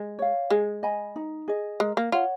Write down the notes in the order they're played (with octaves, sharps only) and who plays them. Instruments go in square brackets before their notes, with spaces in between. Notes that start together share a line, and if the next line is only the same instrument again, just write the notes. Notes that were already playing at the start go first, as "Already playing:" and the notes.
Already playing: [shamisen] G#3
[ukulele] C#5 F5
[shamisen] G#3 [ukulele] G#4
[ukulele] D#5 G#5 B5
D#4
G#4 D#5
[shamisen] G#3 [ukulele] A#4
[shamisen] A#3
[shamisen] F4 [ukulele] C#5 F#5